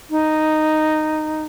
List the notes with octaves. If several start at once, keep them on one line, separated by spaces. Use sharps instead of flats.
D#4